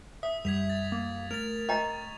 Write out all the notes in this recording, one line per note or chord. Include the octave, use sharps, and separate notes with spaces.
E5 D#6
F#2 G3 G#6 B6 F7
A6
A#3
A3 A#4 A6 F7
D#5 G5 A#5 C#6